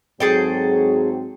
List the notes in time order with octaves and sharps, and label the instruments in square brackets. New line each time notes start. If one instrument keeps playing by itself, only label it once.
[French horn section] G#2 F#3 C4 [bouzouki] G#4 A4 G5